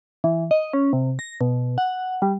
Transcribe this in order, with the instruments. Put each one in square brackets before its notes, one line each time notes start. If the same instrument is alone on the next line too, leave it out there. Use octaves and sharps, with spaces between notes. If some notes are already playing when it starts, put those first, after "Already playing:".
[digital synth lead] E3
D#5
C#4
C3
A#6
B2
F#5
G3